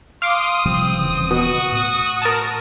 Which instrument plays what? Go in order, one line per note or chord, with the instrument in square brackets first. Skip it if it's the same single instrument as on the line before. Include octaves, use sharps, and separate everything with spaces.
[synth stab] F5 D6 [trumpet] C6 [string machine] D#6
[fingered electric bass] C3 F3 G3 [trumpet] C4
[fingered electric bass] D#1 C#3 E3
[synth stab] B2 [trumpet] F#4
[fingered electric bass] A2
[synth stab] A#4 A5